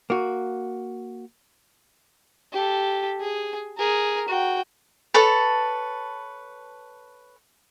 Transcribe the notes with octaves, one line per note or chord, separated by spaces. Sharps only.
A#3 F#4
G4 A4
G#4
G#4 A#4
F#4 G5
A4 B4 C#5 A5